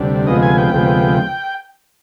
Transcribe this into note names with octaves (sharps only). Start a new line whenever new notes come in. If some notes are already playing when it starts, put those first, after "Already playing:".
Already playing: D2 C3 G3 D4
D2 C3 F3 G#3 B3 D#5
G#5
G5
D2 C3 F3 G#3 B3